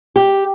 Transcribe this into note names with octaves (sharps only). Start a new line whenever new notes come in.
G4